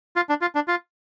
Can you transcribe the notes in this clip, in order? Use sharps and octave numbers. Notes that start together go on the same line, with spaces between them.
F4
D4
F4
D4
F4